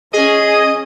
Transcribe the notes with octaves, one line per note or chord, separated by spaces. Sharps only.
C#4 G#4 D#5